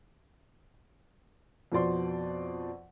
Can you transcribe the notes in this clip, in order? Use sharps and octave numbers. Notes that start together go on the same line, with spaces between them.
F2 B2 C5 D5 C6